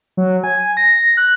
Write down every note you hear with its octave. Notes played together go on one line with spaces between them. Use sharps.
F#3
G#5
A#6
F#6